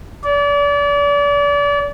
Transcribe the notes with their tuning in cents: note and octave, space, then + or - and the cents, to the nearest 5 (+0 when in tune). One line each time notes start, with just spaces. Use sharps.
D5 -35